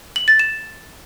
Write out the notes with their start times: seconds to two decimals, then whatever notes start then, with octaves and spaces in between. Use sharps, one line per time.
0.16 F#7
0.28 A6
0.39 E7